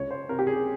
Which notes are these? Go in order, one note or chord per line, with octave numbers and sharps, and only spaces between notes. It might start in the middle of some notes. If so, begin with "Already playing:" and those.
Already playing: C#2 C#5
C5
C3 A#4
G4
G#4